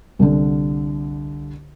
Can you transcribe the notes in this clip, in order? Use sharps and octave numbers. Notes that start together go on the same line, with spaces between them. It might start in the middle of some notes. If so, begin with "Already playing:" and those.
C2 D3